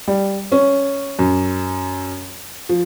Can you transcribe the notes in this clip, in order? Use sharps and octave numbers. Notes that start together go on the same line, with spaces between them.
G3
C#4
F#2
F3